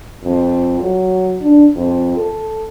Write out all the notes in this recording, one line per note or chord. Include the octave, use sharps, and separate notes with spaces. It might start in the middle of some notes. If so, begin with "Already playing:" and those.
F2
F#3
D4
F2
A4